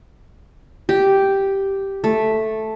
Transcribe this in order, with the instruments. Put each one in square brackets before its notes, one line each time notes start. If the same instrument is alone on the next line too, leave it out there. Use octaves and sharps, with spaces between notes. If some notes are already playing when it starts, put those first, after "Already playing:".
[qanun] G4
A3